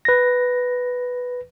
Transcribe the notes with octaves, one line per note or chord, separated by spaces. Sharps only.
B4 A#6